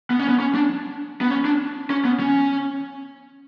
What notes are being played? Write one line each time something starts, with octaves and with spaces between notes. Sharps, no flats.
B3
C#4
B3
C#4
D4
B3
C#4
D4
C#4
B3
C#4